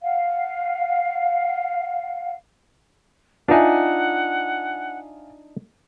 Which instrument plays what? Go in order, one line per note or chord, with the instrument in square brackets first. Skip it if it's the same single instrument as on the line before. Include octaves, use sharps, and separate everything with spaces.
[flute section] F5 F#5
[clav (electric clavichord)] D4 D#4 [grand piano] F4 E5 G#5 [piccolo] F#5